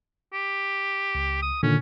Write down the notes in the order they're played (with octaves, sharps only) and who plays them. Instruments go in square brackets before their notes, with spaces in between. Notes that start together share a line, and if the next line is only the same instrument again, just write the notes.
[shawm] G4
[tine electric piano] C#2
[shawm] D#6
[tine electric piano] A#2 D3 D#3 [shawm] C#4